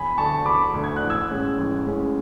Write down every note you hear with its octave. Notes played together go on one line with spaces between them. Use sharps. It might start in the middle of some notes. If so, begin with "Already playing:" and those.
Already playing: E1 G#5 B5
D2 D3 A3 A5 C#6
E1 B5 D6
D2 D3 A3
G#6
F#6
A1
E6 G#6
A2 G#3 C#4
A1
A2 G#3 C#4